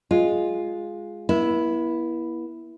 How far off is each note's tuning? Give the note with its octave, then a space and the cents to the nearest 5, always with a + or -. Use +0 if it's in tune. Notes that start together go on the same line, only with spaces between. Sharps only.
G#3 +0 F4 +5
B3 -45 E4 +0